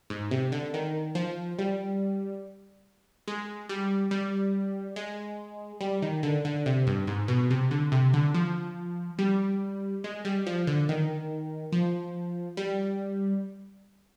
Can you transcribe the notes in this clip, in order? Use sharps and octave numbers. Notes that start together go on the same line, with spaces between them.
G#2
C3
D3
D#3
F3
G3
G#3
G3
G3
G#3
G3
D#3
D3
D3
C3
G2
G#2
B2
C3
D3
C3
D3
F3
G3
G#3
G3
F3
D3
D#3
F3
G3